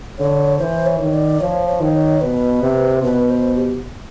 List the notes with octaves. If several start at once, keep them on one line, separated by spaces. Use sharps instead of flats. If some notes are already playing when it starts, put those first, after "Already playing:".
D3 C#5
E3 C5
C#5
D#3
D5
F3 C#5
C#5
D#3
C#5
B2 B4
C3
B2 B4
C5
G4